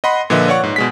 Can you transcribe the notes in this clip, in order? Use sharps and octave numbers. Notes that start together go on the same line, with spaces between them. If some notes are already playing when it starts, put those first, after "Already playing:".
D#5 F#5 B5 C6
A#2 D3 F3 B4 D#5 E5
C#5 D5 F#5 C#6
G#2
B2 G#3 B6